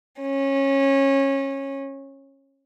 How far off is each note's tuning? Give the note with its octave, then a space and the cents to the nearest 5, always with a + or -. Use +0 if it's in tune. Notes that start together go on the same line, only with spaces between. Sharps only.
C#4 -20